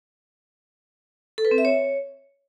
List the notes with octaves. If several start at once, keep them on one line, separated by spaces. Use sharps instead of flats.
A4
B4
C4
E5
C#5